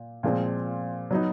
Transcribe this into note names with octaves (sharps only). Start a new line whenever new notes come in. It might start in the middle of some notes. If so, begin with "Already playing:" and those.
Already playing: A#2
A#2 F3 G#3 C4 F4
F#3 B3 D#4